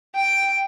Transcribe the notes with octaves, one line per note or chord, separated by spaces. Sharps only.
G5